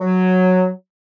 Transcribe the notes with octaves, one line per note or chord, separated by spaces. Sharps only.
F#3